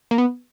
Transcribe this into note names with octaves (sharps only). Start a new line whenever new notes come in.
A#3
B3